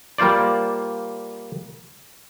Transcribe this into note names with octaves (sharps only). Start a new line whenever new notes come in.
G3 A#3 F4 C5 D5